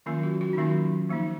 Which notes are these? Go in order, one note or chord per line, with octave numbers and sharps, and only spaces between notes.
D#3 F#3 A#3 C#4 F4
F#4
F#4
D#4
D#3 F#3 A#3 C#4 F4
F3 A#3 D#4